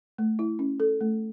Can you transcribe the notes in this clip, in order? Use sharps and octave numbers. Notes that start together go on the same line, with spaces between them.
A3
E4
C#4
A4
A3